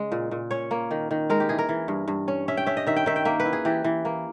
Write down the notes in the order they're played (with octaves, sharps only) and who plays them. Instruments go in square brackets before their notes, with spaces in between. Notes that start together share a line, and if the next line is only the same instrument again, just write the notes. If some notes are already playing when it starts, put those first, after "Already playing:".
Already playing: [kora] C#3 G#3 C#4
A#2
A#2
C#4 C#5
A#3
D#3
D#3
G#3 A#4
G4
E3 G#4
A#4
E3
G2
G2
C#4
C#4 E5
G5
C#4 E5
D#5
D#3 E5
G5
D#3 E5
G5
A#3 E5
B4
E4
G#4
E3 G4
E3
A#3